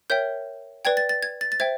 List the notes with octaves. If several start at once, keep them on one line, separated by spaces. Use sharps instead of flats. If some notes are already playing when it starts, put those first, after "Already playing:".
A#4 C#5 E5 G5 G6
B4 D5 G5 G#6
A6
A6
G#6
A6
A6
C5 E5 G5 G#6